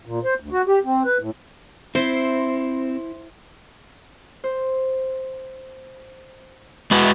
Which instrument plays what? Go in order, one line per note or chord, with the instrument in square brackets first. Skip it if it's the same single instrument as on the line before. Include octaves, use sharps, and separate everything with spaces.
[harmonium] A#2
C5
D2
F#4
G4
C4
B4
A2
[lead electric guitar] C4 [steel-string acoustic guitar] E4 [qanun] C5
[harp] C5
[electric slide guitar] G#3 F#4 B4